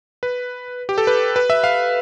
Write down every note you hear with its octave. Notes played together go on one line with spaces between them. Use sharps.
B4
G4
A4
B4
B4
E5
F5